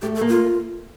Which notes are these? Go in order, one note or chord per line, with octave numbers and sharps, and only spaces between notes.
A3 G4
A4
A#3
F4